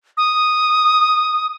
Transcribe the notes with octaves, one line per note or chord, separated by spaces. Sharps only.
D#6